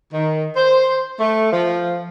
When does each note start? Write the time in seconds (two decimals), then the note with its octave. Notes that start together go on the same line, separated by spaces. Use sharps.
0.12 D#3
0.55 C5
1.20 A3
1.52 F3